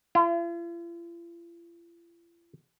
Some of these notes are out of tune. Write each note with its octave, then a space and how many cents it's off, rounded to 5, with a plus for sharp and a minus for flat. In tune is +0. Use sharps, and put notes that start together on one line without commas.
F4 -45